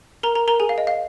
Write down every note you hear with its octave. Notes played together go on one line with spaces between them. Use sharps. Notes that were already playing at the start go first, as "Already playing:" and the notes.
A#4 A#5
A#4 A#5
A#4 A#5
G#4 G#5
F5
D#5
F5